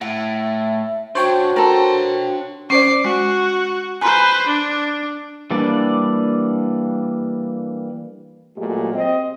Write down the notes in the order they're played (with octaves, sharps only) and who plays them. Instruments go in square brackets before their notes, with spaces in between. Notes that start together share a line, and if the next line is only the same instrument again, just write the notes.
[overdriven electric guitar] A2 [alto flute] E5 [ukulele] F#5
[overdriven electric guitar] B1 D4 [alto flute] F#4 [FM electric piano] C5 C#5 G5
[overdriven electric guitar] D4 C6 [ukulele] A4 A#4
[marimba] C#4 C5 D5 [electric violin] D6 C7
[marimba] G#3 [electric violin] F#4
[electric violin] B4 C5 [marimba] G#5 A#5 C6
[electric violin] D4
[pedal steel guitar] E3 G3 A#3 D4 D5
[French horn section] A#2 F#3 G#3 A3 G4
C4 D#5